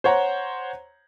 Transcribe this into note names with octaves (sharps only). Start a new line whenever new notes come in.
C5 C#5 F#5 A#5